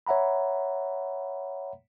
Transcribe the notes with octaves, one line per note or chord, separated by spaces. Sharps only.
C#5 E5 F#5 A#5 B5